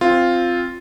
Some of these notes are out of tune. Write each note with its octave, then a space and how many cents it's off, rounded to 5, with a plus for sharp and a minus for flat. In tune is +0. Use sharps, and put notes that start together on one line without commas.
C4 +0 F4 +0